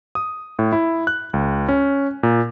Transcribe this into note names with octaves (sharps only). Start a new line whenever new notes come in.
D#6
A2
E4
F#6
C#2
C#4
A#2